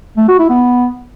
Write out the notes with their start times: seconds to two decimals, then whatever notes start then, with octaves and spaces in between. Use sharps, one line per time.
0.17 A3
0.28 F#4
0.39 E4
0.50 B3